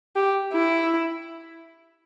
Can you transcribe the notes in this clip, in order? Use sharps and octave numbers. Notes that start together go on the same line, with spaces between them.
G4
E4